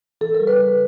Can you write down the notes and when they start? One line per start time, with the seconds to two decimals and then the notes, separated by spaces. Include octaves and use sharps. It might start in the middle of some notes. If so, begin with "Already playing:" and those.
0.21 E3 A4
0.34 A#4
0.40 G3
0.47 B4
0.59 C#3